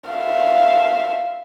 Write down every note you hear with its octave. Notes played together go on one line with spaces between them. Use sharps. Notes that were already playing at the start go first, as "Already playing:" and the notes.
E5 F5